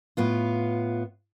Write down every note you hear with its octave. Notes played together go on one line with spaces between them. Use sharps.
A2 B3 F4